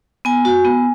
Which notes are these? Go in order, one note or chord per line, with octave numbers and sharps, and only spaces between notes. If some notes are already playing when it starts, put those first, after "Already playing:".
B3 G#5
F#4
B3